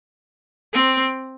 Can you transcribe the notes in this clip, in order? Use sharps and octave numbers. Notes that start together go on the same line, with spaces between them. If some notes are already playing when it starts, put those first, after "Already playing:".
C4